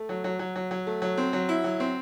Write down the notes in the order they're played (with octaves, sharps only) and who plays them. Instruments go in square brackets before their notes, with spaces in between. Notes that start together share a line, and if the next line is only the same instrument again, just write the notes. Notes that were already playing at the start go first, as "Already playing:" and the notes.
Already playing: [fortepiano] A3
F#3
F#3
F#3
F#3
F#3
A3
F#3
C4
F#3
E4
F#3
C4